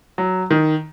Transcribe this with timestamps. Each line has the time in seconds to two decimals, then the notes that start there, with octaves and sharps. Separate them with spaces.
0.18 F#3
0.51 D#3